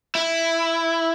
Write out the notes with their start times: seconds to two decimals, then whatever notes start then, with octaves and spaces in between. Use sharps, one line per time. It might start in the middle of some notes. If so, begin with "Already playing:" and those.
0.15 E4